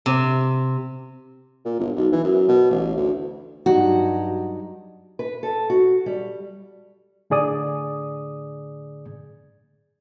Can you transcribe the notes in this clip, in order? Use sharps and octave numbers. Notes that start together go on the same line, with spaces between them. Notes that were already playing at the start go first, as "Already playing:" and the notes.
C3
A#2
G1
B1
E3
F#2
B2
A1
D2
G2 F#3 D#4 F#4 G4
B4
A4
F#4
G3
A2 D3 G#4 D5 D#6